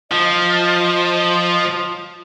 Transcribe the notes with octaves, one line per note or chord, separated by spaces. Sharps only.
F3 D#5